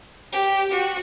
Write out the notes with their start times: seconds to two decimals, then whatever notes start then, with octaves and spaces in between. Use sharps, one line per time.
0.32 G4
0.72 F#4